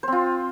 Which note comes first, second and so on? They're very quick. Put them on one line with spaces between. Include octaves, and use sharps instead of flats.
C5 C4 F4